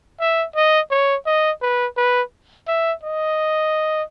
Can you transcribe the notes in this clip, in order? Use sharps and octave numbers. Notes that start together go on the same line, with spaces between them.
E5
D#5
C#5
D#5
B4
B4
E5
D#5